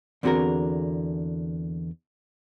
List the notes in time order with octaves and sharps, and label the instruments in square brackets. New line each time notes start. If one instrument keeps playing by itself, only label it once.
[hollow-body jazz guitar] E2 D3 C4 F#4 G#4 A#4